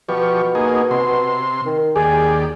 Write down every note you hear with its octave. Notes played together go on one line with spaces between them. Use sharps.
B2 F3 G4 C#6
A#3 D#4 G#4
C3 C6
D#3
D#2 G4 G#4 D5